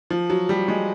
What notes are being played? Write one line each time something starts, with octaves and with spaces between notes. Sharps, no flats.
F3
F#3
G3
G#3